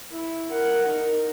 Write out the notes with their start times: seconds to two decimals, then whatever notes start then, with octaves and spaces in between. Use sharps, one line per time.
0.11 E4
0.51 A#4 F#5
0.86 D#4 A#4